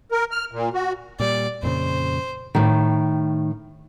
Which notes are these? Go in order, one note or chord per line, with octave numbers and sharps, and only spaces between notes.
A#4
F6
A#2
F#4
A#2 G3 D5
F2 A#2 C#3 C5
A2 D#3